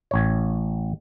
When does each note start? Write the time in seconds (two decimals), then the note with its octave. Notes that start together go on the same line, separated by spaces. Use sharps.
0.11 A1 C#5